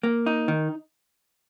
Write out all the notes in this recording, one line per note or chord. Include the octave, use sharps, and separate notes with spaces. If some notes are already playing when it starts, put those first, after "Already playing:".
A#3
D#4
D#3